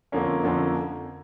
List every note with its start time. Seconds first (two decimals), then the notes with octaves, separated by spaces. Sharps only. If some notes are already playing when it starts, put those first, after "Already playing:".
0.12 F2 D3 F3 A#3 C#4
0.43 F2 D3 F3 A#3 C#4